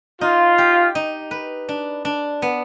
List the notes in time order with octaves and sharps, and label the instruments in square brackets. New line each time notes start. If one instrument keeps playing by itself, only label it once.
[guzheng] D#4 [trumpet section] F4
[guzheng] G4
D#4
B4
D4
D4
B3